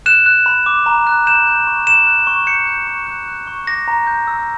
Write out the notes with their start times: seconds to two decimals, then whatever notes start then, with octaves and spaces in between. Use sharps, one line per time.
0.06 F#6 E7
0.26 F#6
0.46 B5
0.66 D6
0.86 A#5
1.07 F#6
1.27 G6 E7
1.47 G6
1.67 C#6
1.86 F#6 E7
2.07 F#6
2.27 C#6
2.47 G6 C#7
2.67 G6
2.87 C#6
3.07 F#6
3.28 F#6
3.47 C#6
3.67 D6 A#6
3.88 A#5
4.07 G6
4.27 E6